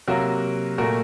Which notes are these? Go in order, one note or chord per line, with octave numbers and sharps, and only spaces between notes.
C3 F#3 A#3 F#4 A#4
A#2 A3 F#4 A#4